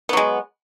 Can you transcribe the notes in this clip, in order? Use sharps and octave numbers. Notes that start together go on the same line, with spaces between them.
F#3 G#3 B3